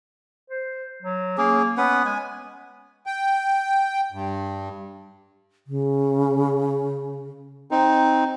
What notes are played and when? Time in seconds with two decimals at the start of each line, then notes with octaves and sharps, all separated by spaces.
0.50 C5
1.02 F#3
1.38 A#3 C#4 G#4
1.77 B3 C#4 B4 F#5
2.05 G#3 G#5
3.07 G5
4.12 G2
5.67 C#3
7.71 C4 D#4